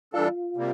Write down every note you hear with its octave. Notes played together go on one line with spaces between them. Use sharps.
E3 G3 D4 F4 A4
C3 G3 A#3